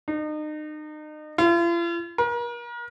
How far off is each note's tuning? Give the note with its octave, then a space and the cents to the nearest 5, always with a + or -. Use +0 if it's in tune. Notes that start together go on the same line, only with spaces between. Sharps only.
D#4 -35
F4 -45
A#4 +40